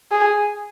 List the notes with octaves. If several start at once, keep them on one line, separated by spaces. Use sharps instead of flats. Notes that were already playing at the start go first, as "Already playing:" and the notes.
G#4